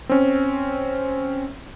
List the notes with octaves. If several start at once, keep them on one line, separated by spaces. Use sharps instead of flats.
C4 C#4